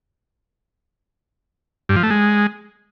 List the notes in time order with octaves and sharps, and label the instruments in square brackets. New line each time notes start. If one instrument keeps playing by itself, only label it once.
[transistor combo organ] G2
F3
A3
G#3